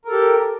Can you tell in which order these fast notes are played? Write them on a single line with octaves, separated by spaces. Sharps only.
A#4 A4 G4